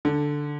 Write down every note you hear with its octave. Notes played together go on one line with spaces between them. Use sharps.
D3